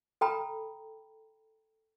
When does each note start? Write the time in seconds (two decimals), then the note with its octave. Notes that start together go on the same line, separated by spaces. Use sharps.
0.21 A4 G5 A#5 B5